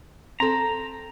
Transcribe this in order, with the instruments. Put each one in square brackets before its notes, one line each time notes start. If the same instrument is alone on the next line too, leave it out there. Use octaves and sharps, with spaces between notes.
[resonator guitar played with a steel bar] C4 A4 [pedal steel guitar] A#5